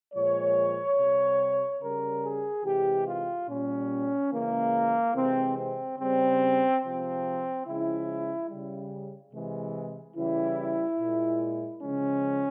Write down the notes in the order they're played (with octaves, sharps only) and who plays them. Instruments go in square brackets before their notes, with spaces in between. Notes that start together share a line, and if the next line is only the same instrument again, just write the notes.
[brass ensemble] A#2 F3 G#3 C#5
C3 G3
C#3 G3 A#4
G#4
C3 E3 G#3 G4
F4
A#2 G3 C#4
C#3 E3 G#3 A#3
C3 E3 G#3 C4
C4
C#3 G3 C4
C3 F3 G#3 C4
C#3 F3 G#3 E4
C#3 G3
C3 E3 G#3
C#3 E3 G3 E4
A#2 G#3
C#3 F3 G#3 C#4